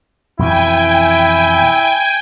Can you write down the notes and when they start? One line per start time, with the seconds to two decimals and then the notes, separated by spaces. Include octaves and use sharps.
0.39 F2 B2 E3 E4 G5 G#5